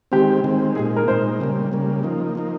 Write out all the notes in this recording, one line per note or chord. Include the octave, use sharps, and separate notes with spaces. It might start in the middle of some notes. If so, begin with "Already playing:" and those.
D#3 G#3 C4 G4
D#3 G#3 C4
A#2 G#3 D#4 G#4
A#4
A#2 G#3 D#4 C5
C#3 G3 A#3
C#3 G3 A#3
F3 A#3 D#4
F3 A#3 D#4